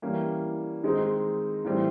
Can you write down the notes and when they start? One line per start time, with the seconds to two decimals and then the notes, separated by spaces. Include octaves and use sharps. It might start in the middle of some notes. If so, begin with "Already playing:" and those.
0.02 E3 G3 A#3 C#4
0.83 D#3 G#3 C4 D#4
1.65 A2 E3 G3 C4